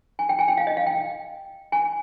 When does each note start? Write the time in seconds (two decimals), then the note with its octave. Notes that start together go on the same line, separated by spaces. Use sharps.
0.19 G#5
0.29 G5
0.39 G#5
0.48 G5
0.58 F5
0.67 D#5
0.77 F5
0.86 G5
1.72 G#5